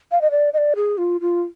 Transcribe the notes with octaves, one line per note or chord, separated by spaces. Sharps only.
F5
D#5
D5
D#5
D5
G#4
F4
F4